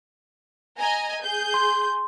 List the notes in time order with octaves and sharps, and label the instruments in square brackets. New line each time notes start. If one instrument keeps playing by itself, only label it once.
[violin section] D#5 G#5 A#5
G#4 G6
[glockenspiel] C6